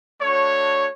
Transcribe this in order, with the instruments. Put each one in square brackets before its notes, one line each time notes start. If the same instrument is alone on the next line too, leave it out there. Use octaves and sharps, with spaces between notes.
[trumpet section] A3 D4 F#4 C#5